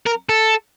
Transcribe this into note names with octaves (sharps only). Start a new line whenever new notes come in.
A#4
A4